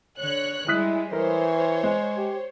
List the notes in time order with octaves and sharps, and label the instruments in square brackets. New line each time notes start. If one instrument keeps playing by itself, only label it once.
[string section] D3 C#5 F#6
[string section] G3 G#3 [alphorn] E4 [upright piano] D#6 F#6 B6
[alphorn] E3 [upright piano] A#4 [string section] C5 C#5
[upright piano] G#3
[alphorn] G4